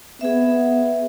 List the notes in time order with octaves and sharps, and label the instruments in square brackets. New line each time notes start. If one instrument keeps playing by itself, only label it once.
[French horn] B3 [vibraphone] G#4 E5